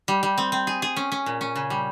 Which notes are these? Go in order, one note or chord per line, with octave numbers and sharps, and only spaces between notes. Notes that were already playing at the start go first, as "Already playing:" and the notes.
G3
G3
C4
C4
G#4
G#4
C#4
C#4
A#2
C#4
C#3
G3